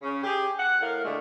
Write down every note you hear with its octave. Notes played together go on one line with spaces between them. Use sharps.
C#3 C#4
G4 G#4
F#5
A2 A#4 F5
A#2 D3 G#3 A3